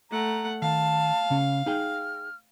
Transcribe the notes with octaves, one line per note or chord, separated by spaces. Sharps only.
A3 F#5 A#5
D#3 F5 A5
C#3 C#4
D#4 G#4 G5 F6